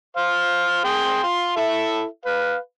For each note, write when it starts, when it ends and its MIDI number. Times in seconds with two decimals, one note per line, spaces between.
0.17 0.80 72
0.17 0.80 77
0.84 1.21 68
0.84 1.21 79
0.84 1.21 84
1.23 1.53 65
1.23 1.53 84
1.57 2.04 64
1.57 2.04 69
1.57 2.04 76
2.25 2.57 71
2.25 2.57 77